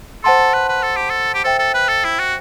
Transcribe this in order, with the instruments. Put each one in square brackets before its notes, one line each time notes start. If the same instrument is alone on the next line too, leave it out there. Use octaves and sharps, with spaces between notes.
[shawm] A4 [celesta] C5 F#5 A5 C6
[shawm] B4
B4
A4
G4
A4
G4
[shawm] A4 [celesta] C5 E5 G5
[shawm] A4
B4
A4
E4
F#4